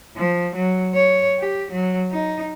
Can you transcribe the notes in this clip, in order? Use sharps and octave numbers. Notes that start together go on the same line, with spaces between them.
F3
F#3
C#5
G4
F#3
D#4